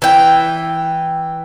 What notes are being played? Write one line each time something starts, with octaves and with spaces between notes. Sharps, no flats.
E3 G5